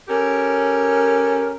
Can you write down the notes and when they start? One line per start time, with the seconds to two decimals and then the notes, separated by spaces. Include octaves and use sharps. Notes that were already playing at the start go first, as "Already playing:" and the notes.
0.08 C#4 G4 A4 A#4